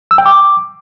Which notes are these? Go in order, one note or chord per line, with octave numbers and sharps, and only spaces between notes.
E6
G5
D6